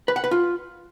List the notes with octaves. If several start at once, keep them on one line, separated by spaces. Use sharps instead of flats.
B4
F#5
B4
F4